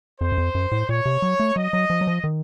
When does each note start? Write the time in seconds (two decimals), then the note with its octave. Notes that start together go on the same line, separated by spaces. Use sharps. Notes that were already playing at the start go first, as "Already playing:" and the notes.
0.21 F2 C5
0.32 F#2
0.38 F2
0.55 F#2
0.72 A2
0.89 A#2 C#5
1.06 C3
1.22 F#3
1.40 A3
1.56 F#3 D#5
1.73 F#3
1.90 F3
2.01 F#3
2.07 F3
2.24 D#3